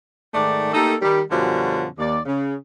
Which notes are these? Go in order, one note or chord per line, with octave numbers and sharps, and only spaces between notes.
G#2 D#3 A3 D5
A3 A#3 D#4 G4 A4
D#3 G3
F#2 B2 D3 F3 G3 C#4
D#2 D5
C#3